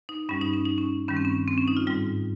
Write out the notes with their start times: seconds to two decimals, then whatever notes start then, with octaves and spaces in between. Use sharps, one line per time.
0.09 D#4
0.29 G2 G3 C#4
0.41 D#4
0.53 C#4
0.65 D#4
0.78 C#4
1.08 G2 D#3 G3 C#4
1.17 C4
1.25 C#4
1.48 C4
1.58 C#4
1.68 D#4
1.77 F4
1.87 G#2 G3 F4